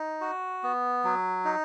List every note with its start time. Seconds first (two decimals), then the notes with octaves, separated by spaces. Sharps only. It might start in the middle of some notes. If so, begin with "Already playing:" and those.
Already playing: D#4
0.21 F#4
0.63 B3
1.04 F#3
1.45 D#4